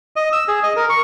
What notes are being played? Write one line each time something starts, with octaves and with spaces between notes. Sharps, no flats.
D#5
E6
G#4
D#5
A#4
C#6